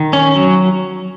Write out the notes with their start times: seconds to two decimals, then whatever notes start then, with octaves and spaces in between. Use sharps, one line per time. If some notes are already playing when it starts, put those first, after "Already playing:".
Already playing: D#3
0.13 C#4
0.36 F#3